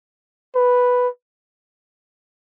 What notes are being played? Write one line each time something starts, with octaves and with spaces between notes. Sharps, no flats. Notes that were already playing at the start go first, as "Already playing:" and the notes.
B4